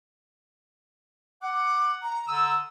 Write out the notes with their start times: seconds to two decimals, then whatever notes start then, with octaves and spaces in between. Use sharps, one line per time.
1.42 F#5 D6
2.02 A#5
2.28 D3 D#6 E6